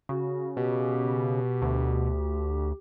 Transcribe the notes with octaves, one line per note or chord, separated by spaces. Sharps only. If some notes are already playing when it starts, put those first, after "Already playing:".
C#3 F#4
B2 G4
D2